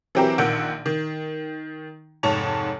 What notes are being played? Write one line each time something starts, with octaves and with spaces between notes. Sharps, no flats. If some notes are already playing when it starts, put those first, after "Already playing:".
E3 F#3 C4 G4 A#4
A#1 D#3 F#5 E6 G6 D7
D#3
F1 G#2 C#5 A5 F7